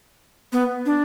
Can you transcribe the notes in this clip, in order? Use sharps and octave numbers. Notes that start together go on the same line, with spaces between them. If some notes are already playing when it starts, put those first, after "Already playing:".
B3
D4